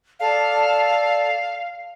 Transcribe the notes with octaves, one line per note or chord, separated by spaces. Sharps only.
A4 D5 F5 A5